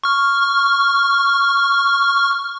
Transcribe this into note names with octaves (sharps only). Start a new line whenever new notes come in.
C#6 F6